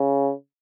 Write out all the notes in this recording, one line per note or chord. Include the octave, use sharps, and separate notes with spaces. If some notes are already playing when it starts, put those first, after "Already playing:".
Already playing: C#3